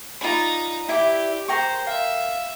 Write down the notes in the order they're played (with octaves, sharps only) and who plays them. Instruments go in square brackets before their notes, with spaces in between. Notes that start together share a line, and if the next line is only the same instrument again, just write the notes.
[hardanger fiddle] D#4 A#5 [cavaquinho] F4 D5 B5
[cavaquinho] E4 D5 E5 [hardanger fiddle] G4
[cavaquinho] A#4 G5 C#6 [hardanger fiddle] C5
[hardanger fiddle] E5 [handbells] F5